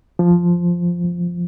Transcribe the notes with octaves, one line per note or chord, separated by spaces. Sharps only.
F3